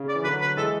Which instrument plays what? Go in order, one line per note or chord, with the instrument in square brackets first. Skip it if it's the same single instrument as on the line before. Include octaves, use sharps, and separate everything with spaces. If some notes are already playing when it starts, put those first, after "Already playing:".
Already playing: [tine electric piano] C#3
[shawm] D5
[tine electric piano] E3
[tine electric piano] D3 F#3 [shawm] B4
[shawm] B4
[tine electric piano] E3 G#3 [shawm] A4